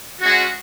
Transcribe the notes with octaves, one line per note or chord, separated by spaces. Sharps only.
G#3 C#4 F#4